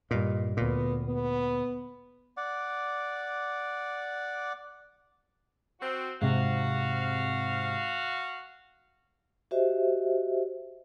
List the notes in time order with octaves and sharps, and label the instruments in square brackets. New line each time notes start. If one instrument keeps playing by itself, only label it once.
[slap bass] G2 A#2 [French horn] D#5
[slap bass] D2 A#2 [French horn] B3
[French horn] B3
[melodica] D5 F#5 D6
[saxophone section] C4 F#4
[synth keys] G#2 C3 [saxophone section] F#4 F5
[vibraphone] F#4 G4 C5 D#5 E5